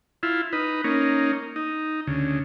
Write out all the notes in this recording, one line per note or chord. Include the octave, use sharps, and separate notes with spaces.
E4 F4
D#4 B4
A#3 C#4 D#4
D#4
D2 C#3